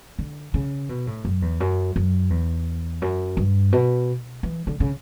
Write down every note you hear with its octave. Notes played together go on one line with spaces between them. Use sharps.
D3
C#3
B2
A2
F#2
E2
F#2
F#2
E2
F#2
G2
B2
E3
D3
C#3